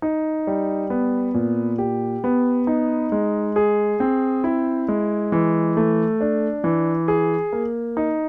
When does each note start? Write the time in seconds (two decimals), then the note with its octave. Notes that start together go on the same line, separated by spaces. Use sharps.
0.02 D#4
0.47 G3
0.90 B3
1.34 A#2
1.78 G4
2.24 B3
2.67 D#4
3.12 G#3
3.56 G#4
4.00 C4
4.44 E4
4.88 G#3
5.32 E3
5.77 A3
6.21 D4
6.64 E3
7.08 G#4
7.53 A#3
7.97 D#4